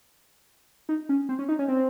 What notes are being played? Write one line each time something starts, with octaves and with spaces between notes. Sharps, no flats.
D#4
C#4
C4
C#4
D#4
C#4
C4